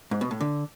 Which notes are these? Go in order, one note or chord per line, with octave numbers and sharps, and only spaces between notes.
G#2
B2
A2
D3